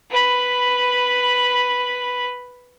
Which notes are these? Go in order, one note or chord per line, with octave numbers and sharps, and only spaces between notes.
B4 B5